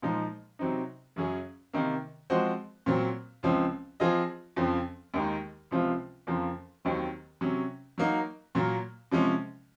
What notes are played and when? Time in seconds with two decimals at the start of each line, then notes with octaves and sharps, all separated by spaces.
0.02 A#2 F3 G#3 D#4
0.59 C3 F#3 C4 D#4
1.16 F#2 C#3 F#3 C#4 G#4
1.73 C3 D#3 A#3
2.30 F3 G#3 C4 F#4 C5
2.86 A#2 F#3 C4
3.43 C#2 C#3 F3 C4
4.00 F3 C4 F4 G#4 D#5
4.56 F2 C#3 F3 C4
5.14 D#2 D#3 G#3 D#4
5.71 C#2 C3 F3 C4 F4
6.27 F2 C#3 F3 A#3
6.85 D#2 D#3 F#3 C4
7.41 C3 F#3 C#4
7.98 F#3 A#3 D#4 F#4
8.55 A#2 F#3 A#3
9.12 C3 F3 G#3 C#4